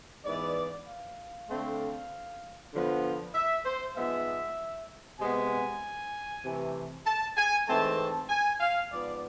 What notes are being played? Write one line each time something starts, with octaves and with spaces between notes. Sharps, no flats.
G#2 E3 B3 D5
F5
D3 A3 C4
D3 F3 B3
E5
C5
G#2 F3 G#3 B3 E5
C3 G#3 B3 G#5
C3 E3 A3
A5
G#5
G#2 E3 A3 C4 A5
G#5
F5
G#2 F3 B3 D5